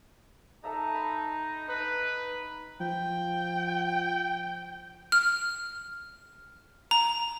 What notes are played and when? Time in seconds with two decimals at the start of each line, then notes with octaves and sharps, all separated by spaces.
0.64 D#4 A4 E5 A#5
0.94 B5
1.68 D#4 B4
2.80 F3 G5
5.12 F6
6.91 A#5